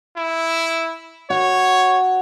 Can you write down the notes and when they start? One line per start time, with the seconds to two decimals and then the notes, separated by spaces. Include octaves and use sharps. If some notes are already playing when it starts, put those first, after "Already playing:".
0.17 E4
1.30 F#4 C#5